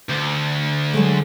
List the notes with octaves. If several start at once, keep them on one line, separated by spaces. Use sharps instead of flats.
D2
F#3 G#3 A3